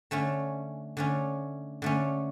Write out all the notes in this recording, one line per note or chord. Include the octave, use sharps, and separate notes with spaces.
D3 A3 C#4
D3 A3 C#4
D3 A3 C#4